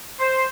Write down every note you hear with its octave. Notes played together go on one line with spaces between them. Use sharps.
C5